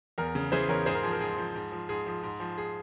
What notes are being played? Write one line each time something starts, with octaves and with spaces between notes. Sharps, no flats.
E2 A#4
C#3
E3 G#4 C5
E2 A#4 C#5
G#2 G#4 C5
A#4
F3 G#4
A#4
G#2 G#4
F3
G#2
F3
G#2 G#4
F3
G#2
F3
G#4